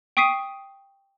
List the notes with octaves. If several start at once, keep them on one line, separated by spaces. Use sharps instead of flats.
G5 C#6 D#6 B6 C7 D#7